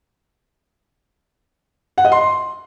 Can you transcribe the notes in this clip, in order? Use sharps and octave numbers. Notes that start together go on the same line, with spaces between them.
F#5
D#5
C6